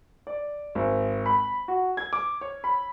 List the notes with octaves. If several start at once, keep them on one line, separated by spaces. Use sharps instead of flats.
D5
G#1
B5
F#4
G#6
D6
C#5
B5